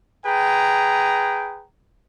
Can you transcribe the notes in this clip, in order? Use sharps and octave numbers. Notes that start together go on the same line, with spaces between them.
G#4 B4 G5 A#5